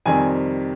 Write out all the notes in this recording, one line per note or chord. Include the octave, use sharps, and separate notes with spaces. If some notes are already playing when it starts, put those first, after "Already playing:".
F2 C3 D#3 G3 C4 G#5